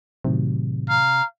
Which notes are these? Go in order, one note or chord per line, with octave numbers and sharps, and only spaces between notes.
A2 C3 D#3 F#3
F5 A#5